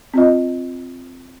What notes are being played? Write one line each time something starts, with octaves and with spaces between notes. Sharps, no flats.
C4 F4 D#5